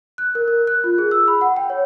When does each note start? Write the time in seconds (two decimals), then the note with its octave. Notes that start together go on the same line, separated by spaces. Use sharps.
0.18 F#6
0.35 A#4
0.48 A#4
0.67 F#6
0.84 F4
0.98 G#4
1.11 E6
1.28 B5
1.41 F#5
1.56 G5
1.70 C#5